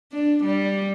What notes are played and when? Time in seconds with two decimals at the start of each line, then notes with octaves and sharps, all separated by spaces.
0.12 D4
0.44 G3